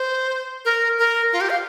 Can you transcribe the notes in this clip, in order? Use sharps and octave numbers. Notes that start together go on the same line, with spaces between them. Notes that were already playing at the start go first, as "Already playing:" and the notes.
Already playing: C5
A#4
A#4
F4
G4
F5